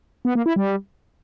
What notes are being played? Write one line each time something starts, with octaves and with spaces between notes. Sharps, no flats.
B3
A#3
E4
G3